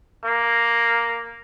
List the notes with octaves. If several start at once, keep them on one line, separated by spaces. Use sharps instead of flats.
A#3